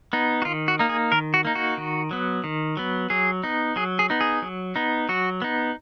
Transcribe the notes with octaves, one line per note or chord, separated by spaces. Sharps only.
B3 D#4
F#4
D#3 F4
F#4
A#3 D#4
G#4
D#3 A#4
F#4
A#3 D#4
F#4
D#3
F#3 B3
D#3
F#3 B3
F#3 G#4
B3 D#4
F#3 G#4
G#4
B3 D#4
G#4
F#3
B3 D#4
F#3 F#4
B3 D#4